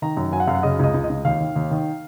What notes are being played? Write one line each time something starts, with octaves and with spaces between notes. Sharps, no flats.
D#3 A#5
F#2
F#3 G#5
F#5
F#2 F5
F#5
C#3 D#5
C#2 D#5
C#2
D#5
C#2
D#2 F5
D#3
D#2
D#3